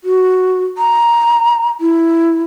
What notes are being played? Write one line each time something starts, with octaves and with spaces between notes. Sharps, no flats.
F#4
A#5
E4